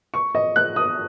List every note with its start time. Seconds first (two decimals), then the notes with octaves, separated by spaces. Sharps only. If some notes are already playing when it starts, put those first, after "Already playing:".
0.14 C#6
0.35 D#5
0.56 F#6
0.76 D#6